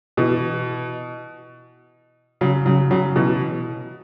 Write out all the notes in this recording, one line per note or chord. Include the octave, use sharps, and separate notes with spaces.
B2 E3
C#3 F#3
C#3 F#3
C#3 F#3
B2 E3